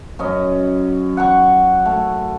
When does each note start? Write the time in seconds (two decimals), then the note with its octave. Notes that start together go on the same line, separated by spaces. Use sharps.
0.19 F#2 C#4 D#5
1.17 F#5 G#5 C#6
1.85 A3